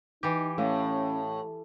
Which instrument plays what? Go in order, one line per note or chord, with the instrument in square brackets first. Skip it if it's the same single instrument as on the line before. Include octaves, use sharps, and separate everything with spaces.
[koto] E3 G4 [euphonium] D#4
[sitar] A2 [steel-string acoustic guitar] A3 F5 [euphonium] C#4